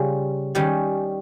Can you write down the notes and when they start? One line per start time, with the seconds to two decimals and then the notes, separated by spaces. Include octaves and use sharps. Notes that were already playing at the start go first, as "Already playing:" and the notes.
Already playing: C#3 G3 C#4 F4
0.55 D#3 G3 C#4